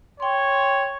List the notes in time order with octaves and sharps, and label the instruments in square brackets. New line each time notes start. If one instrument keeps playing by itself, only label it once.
[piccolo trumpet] C#5 [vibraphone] G5 C6